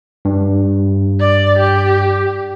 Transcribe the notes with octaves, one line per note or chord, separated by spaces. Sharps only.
G2
D5
G4